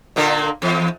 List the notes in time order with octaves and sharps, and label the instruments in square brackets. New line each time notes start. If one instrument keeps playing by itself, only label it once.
[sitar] A#2 D3 A#3
E2